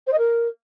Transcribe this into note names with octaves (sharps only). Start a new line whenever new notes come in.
C5
D#5
A#4